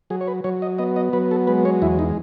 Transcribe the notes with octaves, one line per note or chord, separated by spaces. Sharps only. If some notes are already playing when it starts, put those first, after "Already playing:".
F#3 G#4
C#5
B4
F#3 C#5
D#5
B3 D#5
D#5
F#3 B4
A4
G#3 B4
C#5
E2 E4
D#4